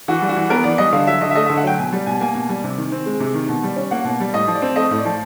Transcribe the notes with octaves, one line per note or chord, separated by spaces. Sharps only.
E3 F#4
G3
F#4
E3
B3 A#4
E3 D5
G3 D#5
D3 F5
F#3 E5
D3 D#5
E5
A3 D#5
E5
D3
F#5
F#3 G5
B2 G#5
G3
B2 G#5
A#3 G#5
B2
G3
C3
D#3
C4
G#3
C3
D#3
B2
G3
C#4
A#3 F#5
B2
G3
A2 D#5
F3
D5
C4
A3 D#5
A2
D5
F3